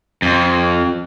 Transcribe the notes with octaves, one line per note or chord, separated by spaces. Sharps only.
F2